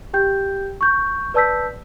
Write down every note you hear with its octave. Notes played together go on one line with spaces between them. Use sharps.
G4 G5 G6
C#6 G6
B4 D5 A5 E6 G6 B6